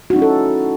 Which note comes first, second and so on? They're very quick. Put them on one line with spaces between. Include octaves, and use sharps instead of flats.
F#4 D#4 C#4 E4 A4